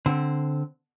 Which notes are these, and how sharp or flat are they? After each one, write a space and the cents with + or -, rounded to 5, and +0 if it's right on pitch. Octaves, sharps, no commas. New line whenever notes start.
D3 +0 C4 +0